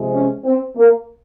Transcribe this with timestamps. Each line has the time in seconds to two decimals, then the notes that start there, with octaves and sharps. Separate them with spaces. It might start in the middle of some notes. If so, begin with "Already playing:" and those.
Already playing: C3 F3 G#3
0.12 C#4
0.44 C4
0.77 A#3